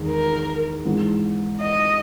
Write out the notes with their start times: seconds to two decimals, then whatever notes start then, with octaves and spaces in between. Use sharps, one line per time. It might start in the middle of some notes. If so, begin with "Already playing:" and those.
Already playing: E2 D#3 G#3
0.08 A#4
0.85 G#2 E3 B3
1.62 D#5